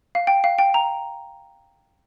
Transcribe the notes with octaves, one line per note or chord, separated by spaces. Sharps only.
F5
G5
F5
G5
A#5